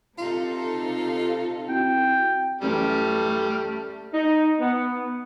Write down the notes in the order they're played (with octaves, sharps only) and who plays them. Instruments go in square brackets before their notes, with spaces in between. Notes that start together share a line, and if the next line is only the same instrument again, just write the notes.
[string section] C3 D#4 A4 [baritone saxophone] F4
[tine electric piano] C4 E4 F#4 [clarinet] G5
[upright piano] F#2 E3 [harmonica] G3 F6 [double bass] A3
[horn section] D#4
B3